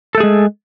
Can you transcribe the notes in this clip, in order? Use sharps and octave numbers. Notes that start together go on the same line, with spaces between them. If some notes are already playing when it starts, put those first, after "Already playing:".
G#3 A3 G#4 A4